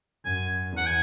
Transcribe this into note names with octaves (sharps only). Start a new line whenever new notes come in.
F#2 G#5
E2
F#5
G#5